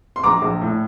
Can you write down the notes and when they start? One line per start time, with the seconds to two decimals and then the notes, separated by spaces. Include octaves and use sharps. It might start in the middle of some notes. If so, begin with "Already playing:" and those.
0.16 C6
0.24 A#1 A#5 D6
0.42 A#1
0.61 A2